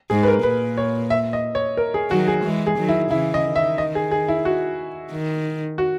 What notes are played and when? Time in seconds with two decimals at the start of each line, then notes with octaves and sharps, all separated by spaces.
0.10 G#2 G#4
0.23 B4
0.28 A#4
0.43 A#2 B4
0.77 C#5
1.10 E5
1.33 D#5
1.55 C#5
1.77 A#4
1.94 G#4
2.10 D#3 F#3 F#4
2.28 G#4
2.44 E3 G#3
2.67 G#4
2.78 D#3 F#3
2.89 E4
3.11 C#3 E3 E4
3.34 D#5
3.45 D#3
3.56 E5
3.78 D#5
3.95 G#4
4.11 G#4
4.28 E4
4.45 F#4
5.12 D#3
5.78 F#4